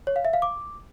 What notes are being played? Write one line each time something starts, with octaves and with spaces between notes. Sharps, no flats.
C#5
F5
E5
F5
D6